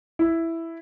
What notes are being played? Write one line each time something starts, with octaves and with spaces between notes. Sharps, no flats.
E4